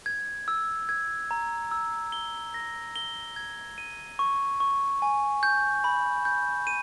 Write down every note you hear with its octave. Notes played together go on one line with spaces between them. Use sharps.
G#6
E6
G#6
A#5
E6
G7
A#6
G7
G#6
D#7
C#6
C#6
G#5
G6
B5
G6
D#7